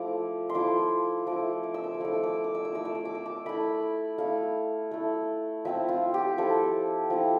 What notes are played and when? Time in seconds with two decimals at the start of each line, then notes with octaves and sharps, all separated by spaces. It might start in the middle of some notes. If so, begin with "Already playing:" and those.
Already playing: F3 A3 E4 D6
0.50 C6
0.55 F3 A3 E4 D6
1.27 F3 A3 E4 D6
1.63 D6
1.74 E6
1.84 D6
1.94 E6
2.00 F3 A3 E4 D6
2.13 E6
2.24 D6
2.34 E6
2.44 D6
2.55 E6
2.65 D6
2.72 A3 E4 E6
2.85 D6
2.95 E6
3.05 D6
3.15 E6
3.26 D6
3.46 A3 E4 B5
4.18 A3 E4 F5
4.91 A3 E4
5.65 F3 C4 E4 E5
5.88 F4
6.14 G4
6.38 F3 C4 E4 A4
7.10 F3 C4 E4